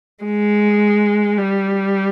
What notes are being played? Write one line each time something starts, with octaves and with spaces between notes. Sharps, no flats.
G#3
G3